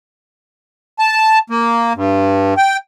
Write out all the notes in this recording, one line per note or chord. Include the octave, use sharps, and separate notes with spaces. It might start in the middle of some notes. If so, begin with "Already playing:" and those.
A5
A#3
G2
G5